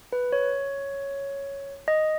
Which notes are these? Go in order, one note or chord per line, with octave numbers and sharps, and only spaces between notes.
B4
C#5
D#5